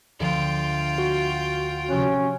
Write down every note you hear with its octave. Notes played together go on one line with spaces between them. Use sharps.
D2 D3 F3 F4 G5
F#4
C3 F3 C#4 F#6